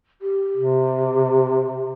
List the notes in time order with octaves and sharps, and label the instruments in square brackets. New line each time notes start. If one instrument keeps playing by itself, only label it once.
[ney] G4
[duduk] C3